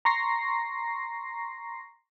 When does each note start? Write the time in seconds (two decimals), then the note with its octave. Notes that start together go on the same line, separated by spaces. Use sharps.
0.05 A#5 C6 C#6 A#6 C7